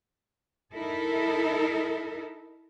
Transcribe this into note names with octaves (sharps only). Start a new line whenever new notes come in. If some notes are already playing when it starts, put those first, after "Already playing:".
D#4 E4 A4 A#4